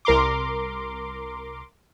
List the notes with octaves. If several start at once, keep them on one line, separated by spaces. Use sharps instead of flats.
C2 A#4 A#5 C6 D6